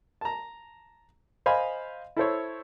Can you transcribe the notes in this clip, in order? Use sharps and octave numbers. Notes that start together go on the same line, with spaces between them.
A5 A#5
C5 D#5 F5 G#5 B5
E4 A4 C5 C#5